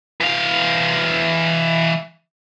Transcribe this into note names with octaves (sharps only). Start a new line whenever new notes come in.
E3 F5